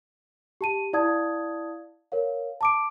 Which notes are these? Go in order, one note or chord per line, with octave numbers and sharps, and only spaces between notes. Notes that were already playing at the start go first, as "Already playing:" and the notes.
G4 A5 D#7
E4 D5 F5 A5 D#6 G#6
A#4 C#5 F5
A5 D6 D7